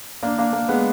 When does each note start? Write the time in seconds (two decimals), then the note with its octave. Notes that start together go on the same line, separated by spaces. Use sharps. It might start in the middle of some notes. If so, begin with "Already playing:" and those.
0.23 A#3 D4
0.38 A#3 D4
0.53 A#3
0.69 G#3 B3